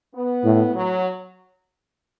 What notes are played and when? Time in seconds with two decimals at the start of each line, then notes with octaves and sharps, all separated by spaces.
0.15 B3
0.45 A2
0.75 F#3